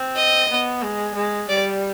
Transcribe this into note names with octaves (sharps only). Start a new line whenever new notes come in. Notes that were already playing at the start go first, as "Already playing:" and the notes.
Already playing: C4
D#5
B3
G#3
G#3
G3 D5